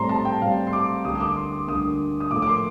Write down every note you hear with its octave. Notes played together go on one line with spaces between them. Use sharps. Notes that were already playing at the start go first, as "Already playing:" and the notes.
Already playing: A2 G3 C4 A#5 C6
A5
G5
A2 G3 C4 F5
C6
D6
D2 D3 G3 A#3 D#6
D#6
D6
C6
D6
D2 D3 G3 A#3 D#6
D#6
A2 F3 A#3 D6
D6
C6